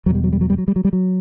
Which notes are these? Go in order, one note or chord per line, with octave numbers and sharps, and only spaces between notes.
E2 B2 F#3 G3
F#3
G3
F#3
G3
F#3
G3
F#3
G3
F#3